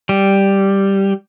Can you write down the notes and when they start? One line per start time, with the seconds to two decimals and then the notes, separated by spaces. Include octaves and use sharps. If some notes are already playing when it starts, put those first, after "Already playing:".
0.09 G3